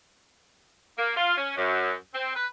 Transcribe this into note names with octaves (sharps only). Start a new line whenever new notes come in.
A#3
F4
C#4
F#2
C4
B4